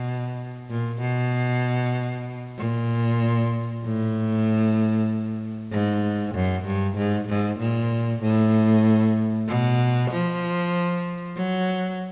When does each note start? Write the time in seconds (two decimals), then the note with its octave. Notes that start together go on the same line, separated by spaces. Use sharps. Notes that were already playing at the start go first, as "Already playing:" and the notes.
Already playing: B2
0.69 A#2
1.01 B2
2.58 A#2
3.84 A2
5.71 G#2
6.35 F#2
6.66 G2
6.97 G#2
7.28 G#2
7.60 A#2
8.23 A2
9.48 B2
10.11 F3
11.37 F#3